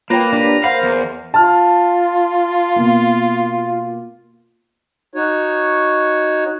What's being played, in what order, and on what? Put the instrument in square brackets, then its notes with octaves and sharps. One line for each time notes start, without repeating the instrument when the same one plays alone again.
[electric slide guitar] A#3 [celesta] F4 C#5 G5 [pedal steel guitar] B4 [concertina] A#5
[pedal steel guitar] D4 G4 B4
[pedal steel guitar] A#4 C5 B5 [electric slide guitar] F5 [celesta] F#5
[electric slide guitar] E2
[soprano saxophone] F4 [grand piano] A5 F6
[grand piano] B2 A#3
[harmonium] D#4 F#4 C#5